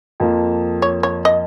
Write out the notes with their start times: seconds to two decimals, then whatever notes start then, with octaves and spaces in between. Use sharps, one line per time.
0.20 F2 F3 A#3
0.82 C#5
1.03 C#5
1.25 D#5